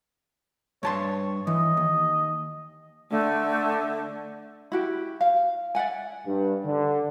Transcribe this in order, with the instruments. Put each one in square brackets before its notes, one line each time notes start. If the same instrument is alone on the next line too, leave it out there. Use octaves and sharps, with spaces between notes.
[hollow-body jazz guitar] G2 A5 C6 [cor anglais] C#5
[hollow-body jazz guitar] E3 [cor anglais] D#5
[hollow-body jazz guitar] D#2
[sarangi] D3 [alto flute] A3
[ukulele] E4 F#4 G4
F5
D5 E5 F#5 G#5
[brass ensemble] G2
D3